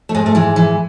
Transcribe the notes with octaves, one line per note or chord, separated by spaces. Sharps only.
A3
G#2 G#3
A3
E3 G#3
E3